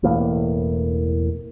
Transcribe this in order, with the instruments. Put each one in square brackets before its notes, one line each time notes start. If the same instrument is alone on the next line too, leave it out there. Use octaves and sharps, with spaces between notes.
[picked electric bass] E1 E2 A2 A#3